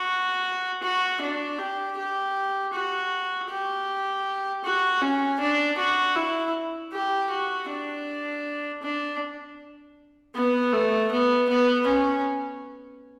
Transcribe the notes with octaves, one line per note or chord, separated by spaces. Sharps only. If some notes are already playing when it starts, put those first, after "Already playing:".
Already playing: F#4
F#4
D4
G4
G4
F#4
G4
F#4
C#4
D4
F#4
E4
G4
F#4
D4
D4
B3
A3
B3
B3
C#4